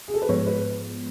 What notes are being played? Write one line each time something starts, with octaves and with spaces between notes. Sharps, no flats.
G#4
A4
B4
G#2 F3 G#3 B3 C#5
B4